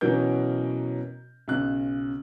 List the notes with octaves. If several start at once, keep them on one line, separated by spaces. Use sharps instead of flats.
B2 E3 F#3 C#4 A#4 G6
B1 C#3 F#6